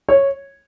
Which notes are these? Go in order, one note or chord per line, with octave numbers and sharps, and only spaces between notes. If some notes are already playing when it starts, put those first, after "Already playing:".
C#5